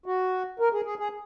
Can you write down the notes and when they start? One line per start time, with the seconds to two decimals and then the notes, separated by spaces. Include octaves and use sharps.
0.06 F#4
0.59 A#4
0.73 G#4
0.85 G#4
0.99 G#4